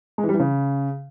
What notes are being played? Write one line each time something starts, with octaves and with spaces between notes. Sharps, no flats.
G#3
E3
G3
E3
C#3